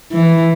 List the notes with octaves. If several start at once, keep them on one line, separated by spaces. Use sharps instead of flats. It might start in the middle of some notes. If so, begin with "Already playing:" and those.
E3